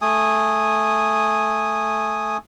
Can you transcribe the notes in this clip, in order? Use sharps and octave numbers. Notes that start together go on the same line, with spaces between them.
A3 G#5 D#6